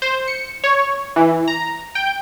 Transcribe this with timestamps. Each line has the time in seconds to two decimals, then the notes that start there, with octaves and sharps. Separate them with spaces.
0.02 C5
0.28 C#7
0.64 C#5
1.16 E3
1.48 A#5
1.95 G5